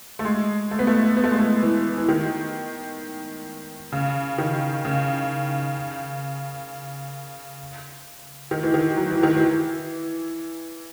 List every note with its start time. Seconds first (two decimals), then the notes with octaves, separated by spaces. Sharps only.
0.19 A3
0.25 G#3
0.71 A3
0.79 B3
0.87 A3
1.17 B3
1.24 A3
1.31 G#3
1.38 A3
1.63 E3
1.97 E3
2.09 D#3
3.92 C#3
4.38 D#3
4.85 C#3
8.51 D#3
8.63 E3
8.74 D#3
8.97 F#3
9.11 E3
9.23 D#3
9.36 E3